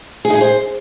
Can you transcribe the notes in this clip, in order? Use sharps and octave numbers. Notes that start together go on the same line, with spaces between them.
G#4
D#4
G#4
C5